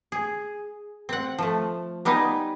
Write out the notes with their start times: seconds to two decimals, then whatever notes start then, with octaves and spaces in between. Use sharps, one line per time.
0.12 G#4
1.09 C4 F#5
1.38 F3 A3
2.05 G3 B3 D#4 B4 G#5